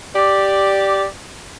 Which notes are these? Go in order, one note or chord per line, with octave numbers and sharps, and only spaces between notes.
G4 D5